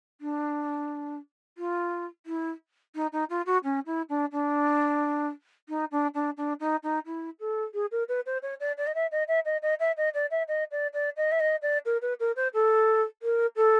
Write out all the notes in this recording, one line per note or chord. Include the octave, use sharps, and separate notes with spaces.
D4
F4
E4
D#4
D#4
F4
F#4
C#4
E4
D4
D4
D#4
D4
D4
D4
D#4
D#4
E4
A4
G#4
A#4
B4
C5
C#5
D5
D5
D#5
E5
D#5
E5
D#5
D#5
E5
D#5
D5
E5
D#5
D5
D5
D#5
E5
D#5
D5
A#4
B4
A#4
C5
A4
A#4
A4